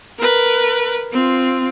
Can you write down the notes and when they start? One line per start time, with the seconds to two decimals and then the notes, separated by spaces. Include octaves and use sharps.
0.19 A#4 B4
1.12 C4 F4